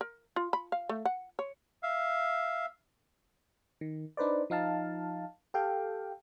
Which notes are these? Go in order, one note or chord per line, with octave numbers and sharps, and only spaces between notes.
A#4
F4
B5
F5
A3
F#5
C#5
E5 F5
D#3
D4 D#4 B4 C5 D5
F3 D#4 F5 A5
G4 A4 F5 G5